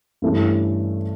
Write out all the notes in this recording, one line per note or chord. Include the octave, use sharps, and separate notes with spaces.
G2 E3 A3 C#4 E4